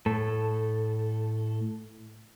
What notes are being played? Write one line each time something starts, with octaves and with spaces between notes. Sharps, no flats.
A2 A4